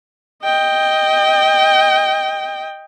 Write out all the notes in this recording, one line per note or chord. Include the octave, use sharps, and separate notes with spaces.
D#5 G5